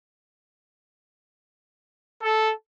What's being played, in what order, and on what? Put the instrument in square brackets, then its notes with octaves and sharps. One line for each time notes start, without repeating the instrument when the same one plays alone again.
[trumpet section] A4